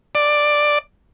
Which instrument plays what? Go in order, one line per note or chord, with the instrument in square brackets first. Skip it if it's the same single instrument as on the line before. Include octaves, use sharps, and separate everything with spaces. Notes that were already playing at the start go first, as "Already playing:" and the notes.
[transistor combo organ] D5